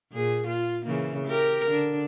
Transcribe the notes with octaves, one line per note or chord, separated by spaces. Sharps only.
A#2 G#4
F4
C#3 E3 A#3
G4 A#4
D3 D4